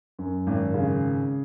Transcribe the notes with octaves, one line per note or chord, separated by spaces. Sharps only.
F#2
G#1
C#3